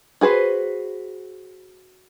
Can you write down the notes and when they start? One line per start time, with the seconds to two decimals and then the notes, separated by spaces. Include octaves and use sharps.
0.21 F#4 G#4 B4 C5